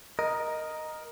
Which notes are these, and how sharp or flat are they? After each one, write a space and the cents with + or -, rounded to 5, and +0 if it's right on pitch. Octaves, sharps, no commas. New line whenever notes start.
A#4 +10 D#5 +0